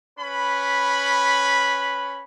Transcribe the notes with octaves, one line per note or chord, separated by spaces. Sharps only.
C#4 B4 B5